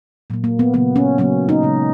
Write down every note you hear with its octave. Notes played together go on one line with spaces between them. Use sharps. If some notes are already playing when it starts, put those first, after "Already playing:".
A#2 F#3 A#3
A#3
B3
C#3 F#3 A#3 B3
C#4
C#3 F#3 A#3 C#4
D#4
C#3 G#3